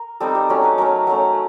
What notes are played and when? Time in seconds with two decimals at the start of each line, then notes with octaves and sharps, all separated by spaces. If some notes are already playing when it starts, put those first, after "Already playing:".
Already playing: A#4
0.20 G3 C4 D#4 A4
0.35 G4
0.49 F#3 A3 C#4 F#4
0.64 B4
0.78 F#3 A3 C#4 A#4
1.07 F#3 A3 C#4